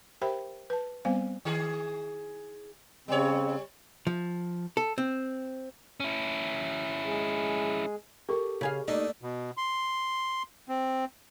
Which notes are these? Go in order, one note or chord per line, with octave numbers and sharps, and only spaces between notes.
G4 A#4 C5 E5 G5 B5
B4 A5
G3 B3 C4 C5 F5 G#5
D#3 G#4
C#3 G3 C4 C#5
F3
A4
C4
C#4 E4
G#3 G#4
G4 A4 A#4 C#6
C#3 G#4 F5
A3 A#3 D4 D#4
B2
C6
C4